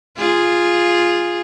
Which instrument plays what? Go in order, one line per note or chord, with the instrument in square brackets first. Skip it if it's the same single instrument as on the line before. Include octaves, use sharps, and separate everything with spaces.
[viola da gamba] F4 G#4